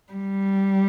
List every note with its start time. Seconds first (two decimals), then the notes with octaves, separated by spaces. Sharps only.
0.13 G3